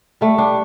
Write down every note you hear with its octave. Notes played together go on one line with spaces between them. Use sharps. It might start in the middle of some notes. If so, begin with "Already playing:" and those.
G3 A3
G3 D4